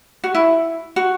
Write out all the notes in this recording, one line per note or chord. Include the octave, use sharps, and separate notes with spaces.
F#4
E4
F#4